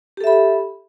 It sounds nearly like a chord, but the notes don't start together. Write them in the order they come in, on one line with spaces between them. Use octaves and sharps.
G4 A4 E5 B5